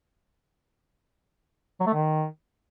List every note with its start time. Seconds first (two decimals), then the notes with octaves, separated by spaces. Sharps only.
1.80 F#3
1.87 A3
1.94 D#3